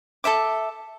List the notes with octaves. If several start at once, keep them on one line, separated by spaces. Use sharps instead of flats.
A4 A#4 E5 D6